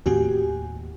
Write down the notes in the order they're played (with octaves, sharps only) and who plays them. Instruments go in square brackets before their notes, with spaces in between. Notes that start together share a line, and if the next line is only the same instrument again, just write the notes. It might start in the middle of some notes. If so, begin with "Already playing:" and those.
[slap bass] D#2 A2 C4 [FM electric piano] F#4 G4 G#5